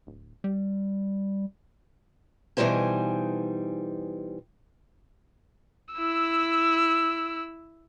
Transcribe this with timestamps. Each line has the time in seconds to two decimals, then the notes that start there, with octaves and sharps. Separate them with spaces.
0.07 D1
0.44 G3
2.57 B2 E3 G3 D#4 C5 G#5
5.94 E4 E6